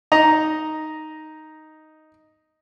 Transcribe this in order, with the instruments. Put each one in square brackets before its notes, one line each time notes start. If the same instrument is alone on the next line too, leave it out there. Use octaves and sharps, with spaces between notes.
[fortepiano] D#4 D#5 A#5